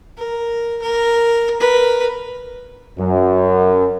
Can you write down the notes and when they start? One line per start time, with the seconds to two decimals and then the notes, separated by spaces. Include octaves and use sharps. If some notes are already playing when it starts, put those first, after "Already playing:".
0.17 A#4
0.82 A#4
1.60 A#4 B4
2.98 F#2